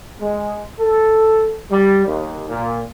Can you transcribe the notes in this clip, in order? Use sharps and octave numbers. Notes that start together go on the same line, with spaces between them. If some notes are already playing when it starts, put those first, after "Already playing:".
G#3
A4
G3
D#2
A#2